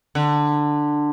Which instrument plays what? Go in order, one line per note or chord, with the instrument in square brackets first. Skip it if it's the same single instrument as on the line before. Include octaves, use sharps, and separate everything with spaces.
[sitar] D3